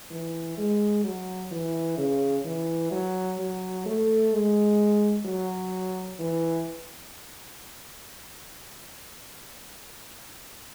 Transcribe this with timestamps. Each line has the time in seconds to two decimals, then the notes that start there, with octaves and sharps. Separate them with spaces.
0.11 E3
0.58 G#3
1.04 F#3
1.51 E3
1.98 C#3
2.45 E3
2.92 F#3
3.39 F#3
3.86 A3
4.33 G#3
5.26 F#3
6.20 E3